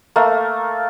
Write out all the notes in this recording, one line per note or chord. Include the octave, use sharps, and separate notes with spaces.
A3 A#3